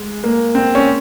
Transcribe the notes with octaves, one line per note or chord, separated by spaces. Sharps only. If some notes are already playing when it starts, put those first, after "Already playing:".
Already playing: G#3
A#3
C4
C#4